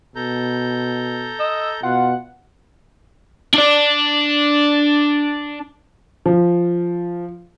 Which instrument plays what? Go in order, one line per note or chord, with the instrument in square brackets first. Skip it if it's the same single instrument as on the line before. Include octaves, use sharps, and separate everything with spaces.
[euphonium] B2 [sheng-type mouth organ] A4 A#5 G6
[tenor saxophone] D#5 [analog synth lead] E6
[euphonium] B2 [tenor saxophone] F4 [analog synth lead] F#5
[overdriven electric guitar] D4 D5
[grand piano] F3